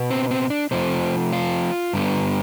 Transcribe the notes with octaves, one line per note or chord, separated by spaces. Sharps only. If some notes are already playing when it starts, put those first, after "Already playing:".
Already playing: B2 B3
C4
C4
D4
C3 F3 A3 C4
F4
G2 D3 G3 B3